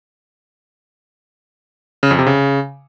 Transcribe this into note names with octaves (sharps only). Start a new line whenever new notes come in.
C#3
F2
C3
C#3